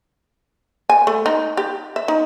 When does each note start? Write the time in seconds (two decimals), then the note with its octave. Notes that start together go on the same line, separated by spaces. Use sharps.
0.90 G#5
1.07 A3
1.26 D#4
1.57 G4
1.96 E5
2.08 D#4